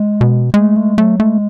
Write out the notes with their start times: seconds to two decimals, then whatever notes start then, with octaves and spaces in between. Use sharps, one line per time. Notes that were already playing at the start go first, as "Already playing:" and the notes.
Already playing: G#3
0.21 B2
0.54 G#3 A3
0.76 G#3 A3
0.98 F#3 A3
1.20 G#3 A3